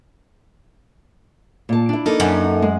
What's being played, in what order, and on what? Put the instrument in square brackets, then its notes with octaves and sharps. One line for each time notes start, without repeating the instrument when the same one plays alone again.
[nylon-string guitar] A#2 A5
D4 E4
[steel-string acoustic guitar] A#3 D#4 A4
[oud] F#2
[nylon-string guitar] G#3